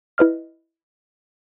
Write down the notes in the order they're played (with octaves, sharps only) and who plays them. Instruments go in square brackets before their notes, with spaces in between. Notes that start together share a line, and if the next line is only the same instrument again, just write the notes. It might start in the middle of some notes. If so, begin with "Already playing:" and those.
[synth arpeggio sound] E4 B4 D#5 F6